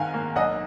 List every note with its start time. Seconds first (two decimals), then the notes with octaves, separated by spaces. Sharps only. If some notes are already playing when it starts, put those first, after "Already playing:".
Already playing: G#2 D#3 F5 G#5
0.14 A#3
0.36 B1 D#5 F#5